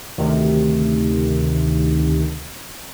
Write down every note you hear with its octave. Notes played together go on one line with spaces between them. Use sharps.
D2 C3 D#3